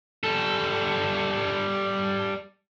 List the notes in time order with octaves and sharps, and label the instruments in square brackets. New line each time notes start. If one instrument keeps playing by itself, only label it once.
[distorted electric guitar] G3 A4